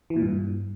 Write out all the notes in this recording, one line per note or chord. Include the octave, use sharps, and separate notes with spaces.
E3
A#2
G2